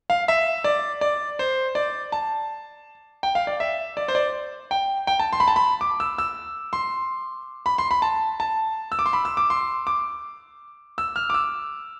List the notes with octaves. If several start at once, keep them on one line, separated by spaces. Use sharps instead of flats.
F5
E5
D5
D5
C5
D5
A5
G5
F5
D5
E5
D5
C5
D5
G5
G5
A5
C6
B5
A5
B5
D6
E6
E6
C6
B5
C6
B5
A5
A5
E6
D6
C6
B5
E6
D6
C6
D6
E6
F6
D6
E6